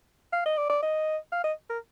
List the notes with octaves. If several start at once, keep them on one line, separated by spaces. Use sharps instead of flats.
F5
D#5
D5
D5
D#5
F5
D#5
A#4